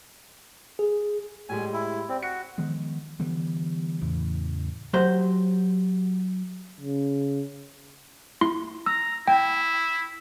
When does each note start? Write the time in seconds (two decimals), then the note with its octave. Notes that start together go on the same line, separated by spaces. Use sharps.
0.79 G#4
1.49 A2 G3 G#3 G#5
1.73 E4
2.09 C4 D5
2.23 F#4 C#7
2.58 D#3 F3 G#3 B3
3.20 D3 E3 G3 B3
4.01 E2 A2 C#3 E3
4.94 F#3 F#4 G4 C5
6.81 C#3
8.41 E4 C6
8.86 A#5 E6
9.28 E4 G5